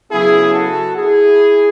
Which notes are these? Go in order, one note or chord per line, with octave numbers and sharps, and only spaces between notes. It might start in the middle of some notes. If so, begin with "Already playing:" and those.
C#3 F#3 B3 E4 G#4
F#4 A4
E4 G#4